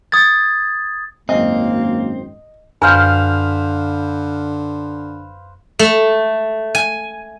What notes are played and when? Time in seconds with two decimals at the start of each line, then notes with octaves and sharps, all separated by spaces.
0.12 D#6 G#6 A6
1.29 G#1 C#2 F#2 A#3 C4 D#5
2.82 F#2 D3 B4 C5 F5 G#5 F6 G6
5.79 A3
6.75 G#5